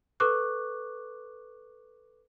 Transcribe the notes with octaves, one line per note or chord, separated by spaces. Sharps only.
A4 B4 C#6 D6 F#6